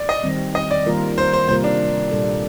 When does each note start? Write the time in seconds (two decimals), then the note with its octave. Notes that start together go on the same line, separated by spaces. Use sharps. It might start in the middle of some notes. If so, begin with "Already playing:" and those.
Already playing: D5
0.09 D#5
0.24 D#3 G3 C4
0.55 D#5
0.71 D5
0.86 D#3 G3 A#3 F4 A#4
1.18 C5
1.33 C5
1.48 C3 G3 A#3 F4 A#4 C5
1.64 D4
2.11 A#2 G3 D4 A4